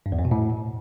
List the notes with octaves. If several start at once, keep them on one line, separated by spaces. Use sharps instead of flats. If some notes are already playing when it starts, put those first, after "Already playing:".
G2
E2
F2
B2
A2